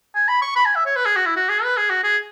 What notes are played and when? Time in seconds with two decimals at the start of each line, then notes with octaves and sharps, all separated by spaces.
0.15 G#5
0.29 B5
0.42 C#6
0.56 B5
0.65 G#5
0.76 E5
0.86 C#5
0.96 B4
1.06 G#4
1.16 F#4
1.26 E4
1.36 F#4
1.49 G#4
1.64 B4
1.77 G#4
1.90 F#4
2.04 G#4